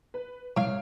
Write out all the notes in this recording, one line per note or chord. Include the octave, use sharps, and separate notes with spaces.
B4
C2 C#5 F5 D7